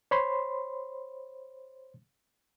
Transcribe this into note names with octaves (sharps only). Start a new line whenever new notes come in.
C5 C#5 B5 C6